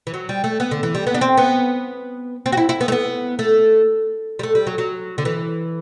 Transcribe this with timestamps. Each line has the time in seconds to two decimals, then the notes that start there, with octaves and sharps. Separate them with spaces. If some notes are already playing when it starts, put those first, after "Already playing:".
0.07 E3
0.14 F#3
0.29 G3
0.44 A3
0.60 B3
0.71 D3
0.83 E3
0.95 G3
1.07 B3
1.14 D4
1.21 C4
1.37 B3
2.46 C4
2.52 F#4
2.57 E4
2.69 E4
2.81 B3
2.88 A3
2.92 B3
3.39 A3
4.39 G3
4.43 A3
4.55 G3
4.67 F#3
4.78 F#3
5.18 D3
5.25 E3